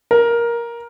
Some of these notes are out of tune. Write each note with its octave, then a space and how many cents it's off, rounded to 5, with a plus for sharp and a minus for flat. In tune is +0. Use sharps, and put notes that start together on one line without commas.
A#4 +10